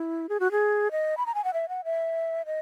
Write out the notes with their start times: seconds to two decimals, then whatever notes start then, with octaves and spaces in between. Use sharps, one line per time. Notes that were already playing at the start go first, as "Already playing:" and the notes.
Already playing: E4
0.29 G#4
0.40 F#4
0.52 G#4
0.91 D#5
1.17 B5
1.26 A#5
1.35 G#5
1.44 F#5
1.53 E5
1.69 F#5
1.85 E5
2.46 D#5